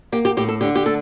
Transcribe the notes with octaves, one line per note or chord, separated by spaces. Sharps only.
A#3 G4
G4
A2 G4
A4
D3 G4
G4
A3 A4